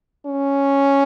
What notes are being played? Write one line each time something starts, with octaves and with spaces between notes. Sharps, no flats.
C#4